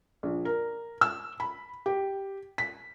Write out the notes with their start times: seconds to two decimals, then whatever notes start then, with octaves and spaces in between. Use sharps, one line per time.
0.23 A#1
0.45 A#4
1.01 E6
1.40 B5
1.86 G4
2.58 B6